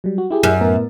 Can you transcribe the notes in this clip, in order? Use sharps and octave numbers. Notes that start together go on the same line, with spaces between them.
F#3 G3
F#4
E4 G4 G#4
F#2
A2 B3 A#4